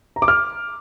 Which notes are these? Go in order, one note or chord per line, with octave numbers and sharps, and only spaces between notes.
A#5
D6
F6